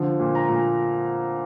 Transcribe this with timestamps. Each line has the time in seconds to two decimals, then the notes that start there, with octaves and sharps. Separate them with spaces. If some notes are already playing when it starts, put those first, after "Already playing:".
Already playing: D3 F3
0.20 A#2
0.35 A#5
0.49 A#2